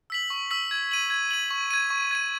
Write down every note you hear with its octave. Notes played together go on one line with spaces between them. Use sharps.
E6 B6 F#7
C#6
E6 B6 F#7
G#6
D#7 F#7
G#6
D#7 F#7
C#6
G#6 D#7
C#6
G#6 D#7